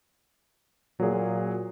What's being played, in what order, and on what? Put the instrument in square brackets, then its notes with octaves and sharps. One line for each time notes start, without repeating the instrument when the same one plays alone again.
[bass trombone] A#2 [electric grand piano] F#3 G#4